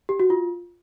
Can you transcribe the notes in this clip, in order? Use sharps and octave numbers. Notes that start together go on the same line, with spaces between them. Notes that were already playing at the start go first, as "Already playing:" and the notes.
G4
F#4
F4